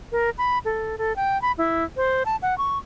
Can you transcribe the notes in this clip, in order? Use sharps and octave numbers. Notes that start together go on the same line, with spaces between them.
A#4
B5
A4
A4
G5
B5
E4
C5
A5
F#5
C#6